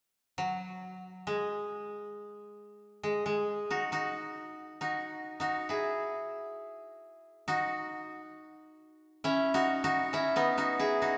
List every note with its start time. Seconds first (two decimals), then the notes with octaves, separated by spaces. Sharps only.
0.38 F#3
1.27 G#3
3.03 G#3
3.26 G#3
3.70 D#4 F#4
3.92 D#4 F#4
4.81 D#4 F#4
5.40 D#4 F#4
5.69 E4 G#4
7.48 D#4 F#4
9.24 C#4 E4
9.54 D#4 F#4
9.84 D#4 F#4
10.13 C#4 E4
10.36 B3 D#4
10.58 D#4 F#4
10.79 E4 G#4
11.02 D#4 F#4